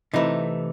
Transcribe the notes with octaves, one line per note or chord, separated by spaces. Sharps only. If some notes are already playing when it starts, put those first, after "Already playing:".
C3 E3 A3 D#4